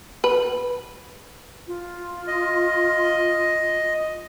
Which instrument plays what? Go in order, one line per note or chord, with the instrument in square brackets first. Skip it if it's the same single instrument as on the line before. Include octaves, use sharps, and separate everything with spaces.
[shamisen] B4
[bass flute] F4
[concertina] D#5